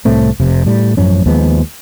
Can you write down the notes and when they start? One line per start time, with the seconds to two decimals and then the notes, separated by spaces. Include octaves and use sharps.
0.05 C2 A2 A3 C4
0.40 F1 C3
0.66 A2 G3
0.97 A1 F#2 F3 C#4
1.26 D#2 F3 G#3 B3